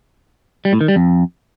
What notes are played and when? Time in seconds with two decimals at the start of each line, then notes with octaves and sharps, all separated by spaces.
0.65 G3
0.73 A2
0.81 D#3
0.88 G3
0.96 F2